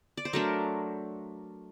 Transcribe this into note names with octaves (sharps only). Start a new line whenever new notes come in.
D5
C5
F#3 A3 D4 A#4